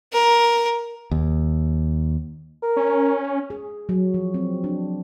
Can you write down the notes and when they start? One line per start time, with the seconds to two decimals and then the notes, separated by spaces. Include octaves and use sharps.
0.13 A#4
1.11 D#2
2.62 A#4
2.76 C#4
3.50 G#4
3.89 F#3
4.14 F3
4.34 C4
4.64 D4